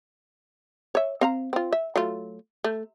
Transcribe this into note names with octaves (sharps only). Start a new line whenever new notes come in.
C#5 E5
C4 F5 A#5
C4 F4
E5
F#3 A3 F4
A3